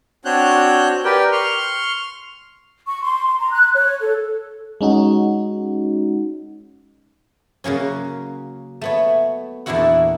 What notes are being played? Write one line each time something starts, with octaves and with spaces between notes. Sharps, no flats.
C4 D4 F#4 C#5 F#6 G6
G4 A#4 B4 D5 G5
C6 C#6 F6
C#6
C6
C6
A#5
F#6
C#5
A4
G#3 C#4 D#4 F#4
C#3 F#3 A#3 C#4
A3 B3 C#5
E2 A#2 D4 E4 F#4 F#5